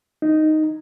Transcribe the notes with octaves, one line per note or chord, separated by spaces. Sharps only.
D#4